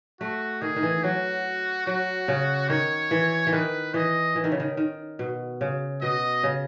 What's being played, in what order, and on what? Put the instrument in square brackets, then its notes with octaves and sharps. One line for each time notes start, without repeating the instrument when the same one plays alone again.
[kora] A3 [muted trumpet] F#4
[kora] D#3 [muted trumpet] G#4
[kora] D#3
E3
[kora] F#3 [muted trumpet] F#4
[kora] F#3 [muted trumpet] F#4
[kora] C#3
[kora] D#3 [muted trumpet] C#5
[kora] E3
E3
[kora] D#3 [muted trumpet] B4
[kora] E3 [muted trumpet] D#5
[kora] E3
D#3
C#3
D#3
D#3
B2
C#3
[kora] B2 [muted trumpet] D#5
[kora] C#3